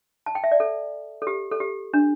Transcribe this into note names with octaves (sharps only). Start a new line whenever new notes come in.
A5
G5
E5
D5
A4
A4
G4
A4
G4
D4